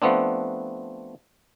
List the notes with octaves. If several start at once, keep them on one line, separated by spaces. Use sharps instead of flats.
F3 A3 B3 C4 D4